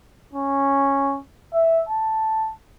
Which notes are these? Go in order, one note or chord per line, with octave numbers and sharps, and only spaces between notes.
C#4
E5
A5